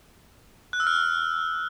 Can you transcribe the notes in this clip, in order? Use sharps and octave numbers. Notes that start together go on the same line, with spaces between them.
F#6
E6
F6